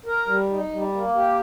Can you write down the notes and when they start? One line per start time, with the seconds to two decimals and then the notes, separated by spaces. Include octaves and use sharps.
0.06 A#4
0.27 G3
0.50 D#4
0.71 G3
0.93 A#3
1.15 G4